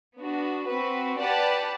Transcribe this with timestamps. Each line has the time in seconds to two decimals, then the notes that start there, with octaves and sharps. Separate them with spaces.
0.17 B3 D4 F#4
0.67 C4 F#4 B4
1.18 G4 B4 D5 F#5 A5